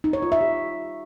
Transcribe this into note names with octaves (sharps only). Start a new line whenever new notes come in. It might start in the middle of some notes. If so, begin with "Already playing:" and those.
D#4
C#5
F4
E5
G4